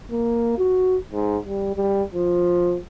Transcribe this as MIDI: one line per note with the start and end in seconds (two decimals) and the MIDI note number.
0.11 0.53 58
0.58 0.97 66
1.12 1.38 44
1.46 1.73 55
1.76 2.03 55
2.14 2.77 53